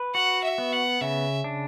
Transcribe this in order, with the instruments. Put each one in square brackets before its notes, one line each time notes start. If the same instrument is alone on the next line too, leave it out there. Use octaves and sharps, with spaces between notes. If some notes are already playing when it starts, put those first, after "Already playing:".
Already playing: [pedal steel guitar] B4
[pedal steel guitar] F#4 [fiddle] F#5
[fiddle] E5
[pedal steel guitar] B3
[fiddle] F#5
[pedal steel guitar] C#3 [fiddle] E5
[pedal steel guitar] D4